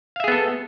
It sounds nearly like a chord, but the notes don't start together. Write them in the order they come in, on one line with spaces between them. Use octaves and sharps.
F5 E5 G#4 B3 A4